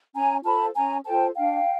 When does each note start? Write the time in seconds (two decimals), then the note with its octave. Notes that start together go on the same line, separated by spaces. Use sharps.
0.15 C#4 G#5 A#5
0.44 F4 A4 C5 A5 B5
0.75 C#4 G#5 A#5
1.05 F4 A4 C5 G5 A5
1.35 D4 F5 G5